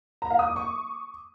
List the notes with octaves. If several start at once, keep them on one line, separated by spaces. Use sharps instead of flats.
A#5
F5
D#6
D6
C#6